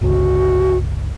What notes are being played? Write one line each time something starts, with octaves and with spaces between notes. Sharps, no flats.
G1 C#2 F#4